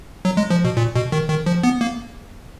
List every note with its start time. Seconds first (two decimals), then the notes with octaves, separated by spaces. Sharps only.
0.25 F#3
0.37 G#3
0.50 F3
0.64 B2
0.77 A#2
0.95 B2
1.12 D#3
1.29 D#3
1.46 F3
1.64 B3
1.81 A#3